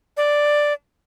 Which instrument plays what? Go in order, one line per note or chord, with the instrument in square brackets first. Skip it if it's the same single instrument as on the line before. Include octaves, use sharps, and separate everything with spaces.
[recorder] D5